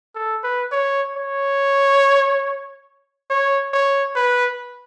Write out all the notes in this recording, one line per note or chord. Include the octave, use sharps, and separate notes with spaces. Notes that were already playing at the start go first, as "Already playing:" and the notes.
A4
B4
C#5
C#5
C#5
C#5
B4